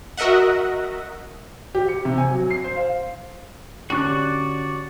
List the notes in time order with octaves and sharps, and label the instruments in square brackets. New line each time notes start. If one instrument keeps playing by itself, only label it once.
[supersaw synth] F#4 A#4 D#5 E5 F#5
[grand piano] G4
C#7
C3
G#5
F#3
C7
C5
F5
[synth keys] D3 C#4 D4 [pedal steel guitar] F#4 D5 F#6 [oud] G4 [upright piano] C#6